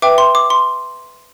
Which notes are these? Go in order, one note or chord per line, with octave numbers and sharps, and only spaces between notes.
B4 E5 G5 D6
C6
D6
C6